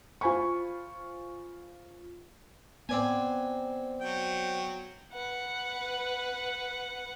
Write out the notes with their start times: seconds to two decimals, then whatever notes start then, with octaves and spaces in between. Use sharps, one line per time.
0.21 F4 C5 G#5 B5 C#6
2.89 B3 C4 D5 G#5
4.01 F#3 G5
5.13 B4 F#5